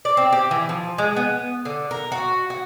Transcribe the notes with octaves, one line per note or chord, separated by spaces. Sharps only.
D5
C4
G4
E3
F3
G#3
B3
D3
A#4
F#4
F#4